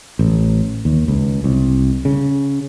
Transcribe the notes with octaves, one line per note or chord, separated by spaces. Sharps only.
A1
D#2
C#2
C2
C#3